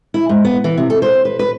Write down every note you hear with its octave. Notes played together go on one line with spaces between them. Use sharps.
E4
G#2
B3
E3
C3
A4
C5
B4
B4